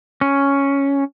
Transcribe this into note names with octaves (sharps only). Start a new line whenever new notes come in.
C#4